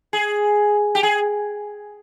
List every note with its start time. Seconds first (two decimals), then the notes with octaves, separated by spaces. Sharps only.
0.13 G#4
0.95 G4
1.03 G#4